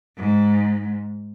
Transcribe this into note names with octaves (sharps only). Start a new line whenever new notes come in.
G#2